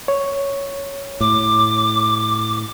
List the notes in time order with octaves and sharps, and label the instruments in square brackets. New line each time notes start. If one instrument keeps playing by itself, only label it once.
[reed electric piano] C#5
[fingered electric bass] A2 [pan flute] D6